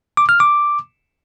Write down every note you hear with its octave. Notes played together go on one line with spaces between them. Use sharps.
D6
F6
D6